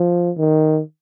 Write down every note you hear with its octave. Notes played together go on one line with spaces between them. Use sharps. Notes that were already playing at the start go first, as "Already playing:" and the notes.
Already playing: F3
D#3